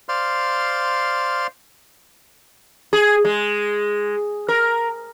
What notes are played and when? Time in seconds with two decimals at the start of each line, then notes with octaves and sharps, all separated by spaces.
0.09 C5 D5 F5 C6 F6
2.93 G#4
3.25 G#3
4.48 A#4